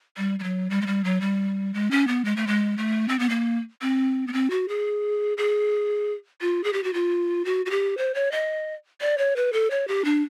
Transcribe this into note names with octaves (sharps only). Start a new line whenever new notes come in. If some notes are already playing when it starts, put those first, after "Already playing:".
G3
G3
F#3
G3
G#3
G3
F#3
G3
G#3
C#4
B3
G#3
A3
G#3
A3
C4
B3
A#3
C4
B3
C4
F#4
G#4
G#4
F4
G#4
G4
F#4
F4
F#4
F#4
G4
C5
C#5
D#5
D5
C#5
B4
A4
C#5
G4
D4